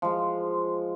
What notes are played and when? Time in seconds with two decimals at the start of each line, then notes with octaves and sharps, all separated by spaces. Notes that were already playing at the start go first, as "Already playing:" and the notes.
0.02 F3 G#3